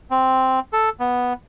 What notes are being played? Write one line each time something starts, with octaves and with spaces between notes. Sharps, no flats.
C4
A4
B3